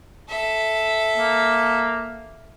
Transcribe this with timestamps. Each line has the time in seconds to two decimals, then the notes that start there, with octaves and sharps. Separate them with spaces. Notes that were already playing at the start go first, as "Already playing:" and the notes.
0.30 A4 E5
1.16 A#3